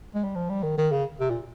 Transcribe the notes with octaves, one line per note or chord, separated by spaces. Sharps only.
G#3
G3
F3
G3
D#3
D#3
C#3
C3
A#2